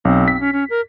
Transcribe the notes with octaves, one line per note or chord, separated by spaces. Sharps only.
B1 C4
B6
C#4
C#4
A#4